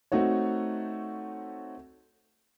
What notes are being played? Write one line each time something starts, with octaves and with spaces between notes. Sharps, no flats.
A3 C4 D#4 F#4 C#5